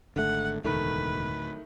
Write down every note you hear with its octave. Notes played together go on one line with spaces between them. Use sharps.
G#1 D3 A3 F#5
E1 D2 A2 D#3 A3 B4